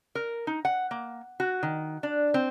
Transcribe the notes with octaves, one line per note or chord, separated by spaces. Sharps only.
A#4
D#4
F#5
A#3
F#4
D#3
D4
C4